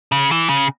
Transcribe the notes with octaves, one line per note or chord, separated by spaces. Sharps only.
C#3
E3
C#3